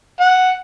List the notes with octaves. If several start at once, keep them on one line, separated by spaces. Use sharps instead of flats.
F#5